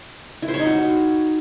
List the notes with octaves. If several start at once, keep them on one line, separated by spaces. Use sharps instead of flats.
E4
C5
C#5
D#4
F#4